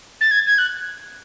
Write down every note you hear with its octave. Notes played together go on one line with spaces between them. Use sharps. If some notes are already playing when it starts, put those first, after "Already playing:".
A6
G#6
G#6
F#6